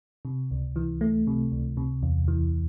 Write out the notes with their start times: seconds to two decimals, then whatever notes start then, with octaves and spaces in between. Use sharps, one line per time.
0.25 C3
0.51 C#2
0.76 E3
1.01 A3
1.27 C3
1.52 C#2
1.77 C3
2.03 E2
2.28 E3